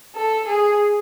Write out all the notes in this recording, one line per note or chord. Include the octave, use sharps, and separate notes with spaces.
A4
G#4